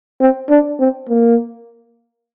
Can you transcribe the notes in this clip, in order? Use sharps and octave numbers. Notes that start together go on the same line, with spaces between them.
C4
D4
C4
A#3